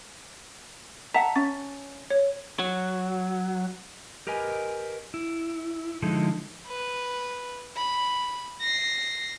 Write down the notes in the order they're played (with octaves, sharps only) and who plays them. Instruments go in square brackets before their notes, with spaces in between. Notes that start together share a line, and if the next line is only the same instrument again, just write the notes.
[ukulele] E5 F#5 [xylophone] A5 A#5 B6
[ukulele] C#4 [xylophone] A6
[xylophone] C#5
[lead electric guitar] F#3
[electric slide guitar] G4 A#4 B4 D#5 G#5
E4
D3 F3 G#3 D#4 E4 A4
[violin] B4
B5
A#6 C7